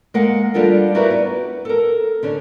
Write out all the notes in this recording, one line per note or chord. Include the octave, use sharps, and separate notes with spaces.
G#3 A#3 A#4 F5 F#5
G3 D4 F4 A4 A#4
E4 F#4 G4 A#4 B4 D5
B3
A4 A#4
D3 C#4 D4